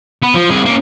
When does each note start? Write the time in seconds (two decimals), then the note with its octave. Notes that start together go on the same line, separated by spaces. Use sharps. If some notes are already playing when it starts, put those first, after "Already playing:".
0.23 B3
0.35 F3
0.51 C2 G#4
0.66 A#3 C#4